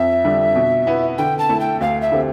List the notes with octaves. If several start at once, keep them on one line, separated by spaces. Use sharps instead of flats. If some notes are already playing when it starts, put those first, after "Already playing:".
Already playing: F2 E5
D3 G3 D4
B2
B3 E4
D3 G5
A5
A3 E4 A4
G5
D2 F5
E5
D3 A3 C4 G4